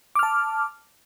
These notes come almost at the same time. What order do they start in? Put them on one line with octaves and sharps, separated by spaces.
D6 F6 A5